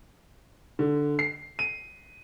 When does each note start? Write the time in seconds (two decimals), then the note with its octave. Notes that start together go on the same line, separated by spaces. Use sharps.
0.79 D3
1.19 C7
1.59 D#7